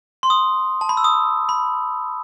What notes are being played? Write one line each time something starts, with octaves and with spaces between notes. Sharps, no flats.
C6
D#6
A5
B5
E6
D#6
B5